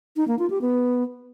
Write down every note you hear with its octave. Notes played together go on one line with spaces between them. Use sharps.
D#4
A#3
F4
G4
B3